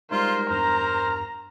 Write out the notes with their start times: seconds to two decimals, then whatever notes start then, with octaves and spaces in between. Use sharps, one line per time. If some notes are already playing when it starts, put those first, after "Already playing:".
0.11 G3 G#3 D#4 F4 A#4 C5
0.50 E2 G2 C5 A#5 F6